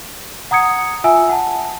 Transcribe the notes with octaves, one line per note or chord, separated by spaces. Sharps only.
F#5 A#5 D#6 G#6 C#7
F4 E5 G#5 E6
F#5 A5